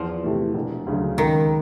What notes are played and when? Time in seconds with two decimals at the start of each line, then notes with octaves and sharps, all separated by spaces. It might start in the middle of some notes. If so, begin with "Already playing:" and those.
Already playing: E2 F3
0.24 C3 E3 A3
0.54 E1
0.86 D2 C#3 F#3
1.18 C#2 D#3